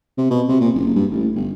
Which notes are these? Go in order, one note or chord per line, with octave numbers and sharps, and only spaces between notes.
C3
B2
C3
A#2
F#1
G2
A1
G1